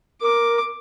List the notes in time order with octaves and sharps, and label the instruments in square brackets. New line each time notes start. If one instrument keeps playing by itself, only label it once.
[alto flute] A#4 [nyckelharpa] D6